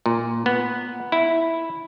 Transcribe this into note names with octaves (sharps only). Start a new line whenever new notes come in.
A#2
B3
E4